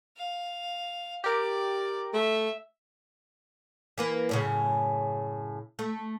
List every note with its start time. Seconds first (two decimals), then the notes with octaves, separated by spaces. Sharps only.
0.17 F5
1.24 G4 A#4 D5
2.14 A3 E5
3.98 E3 A#3 B4
4.29 F#2 A2 C#3
5.79 A3